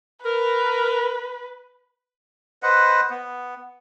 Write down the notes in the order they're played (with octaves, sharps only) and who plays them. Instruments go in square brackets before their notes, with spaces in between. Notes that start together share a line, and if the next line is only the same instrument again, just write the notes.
[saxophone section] A#4 [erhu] B4
[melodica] B4 C5 D#5 F#5
B3